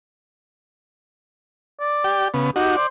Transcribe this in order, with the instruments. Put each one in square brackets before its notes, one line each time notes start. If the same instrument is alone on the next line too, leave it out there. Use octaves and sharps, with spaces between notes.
[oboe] D5
[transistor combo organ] G4 G5
C#3 B3
[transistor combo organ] D#4 F#4 [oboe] G4
[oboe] C5 [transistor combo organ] D5